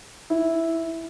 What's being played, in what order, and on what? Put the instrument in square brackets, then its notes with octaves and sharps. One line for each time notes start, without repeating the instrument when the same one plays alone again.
[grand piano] E4